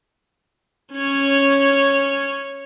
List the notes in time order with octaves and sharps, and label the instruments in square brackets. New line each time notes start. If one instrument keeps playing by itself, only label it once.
[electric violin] C#4 C#5